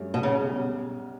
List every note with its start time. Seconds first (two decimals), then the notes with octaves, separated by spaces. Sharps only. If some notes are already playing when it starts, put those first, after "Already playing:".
Already playing: G2 F#3 A3 C#4
0.14 B2
0.23 C#3
0.44 B1 B2 G3 C#4